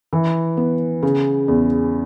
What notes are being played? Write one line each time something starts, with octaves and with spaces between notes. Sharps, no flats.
E3
B3
C#3
E2